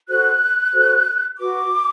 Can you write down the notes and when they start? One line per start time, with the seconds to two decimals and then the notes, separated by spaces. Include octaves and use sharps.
0.08 F#4 A4 C5 F#6
0.74 F#4 A4 C5
1.38 F#4 B4 D6